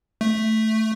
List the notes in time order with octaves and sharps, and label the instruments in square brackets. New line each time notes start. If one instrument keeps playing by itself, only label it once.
[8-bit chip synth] A3